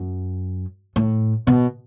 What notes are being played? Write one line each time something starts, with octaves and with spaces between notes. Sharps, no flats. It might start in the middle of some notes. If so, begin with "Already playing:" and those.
Already playing: F#2
A2
B2